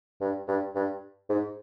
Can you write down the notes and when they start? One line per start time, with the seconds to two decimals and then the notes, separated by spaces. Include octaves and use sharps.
0.21 G2
0.48 G2
0.76 G2
1.29 G#2